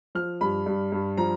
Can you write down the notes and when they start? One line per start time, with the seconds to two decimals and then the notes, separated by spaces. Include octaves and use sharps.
0.15 F3 F6
0.41 G2 B5
0.66 G2
0.92 G2
1.17 F3 A#5